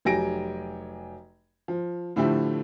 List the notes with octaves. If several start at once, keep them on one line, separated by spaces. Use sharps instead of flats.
F1 F#3 G4 G#5 A#6 D7
F3
A2 D3 F3 A3 E4 G4